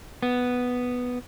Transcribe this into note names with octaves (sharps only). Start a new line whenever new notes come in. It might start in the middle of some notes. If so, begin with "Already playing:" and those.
B3